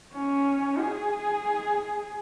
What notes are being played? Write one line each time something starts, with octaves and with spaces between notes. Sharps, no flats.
C#4
G#4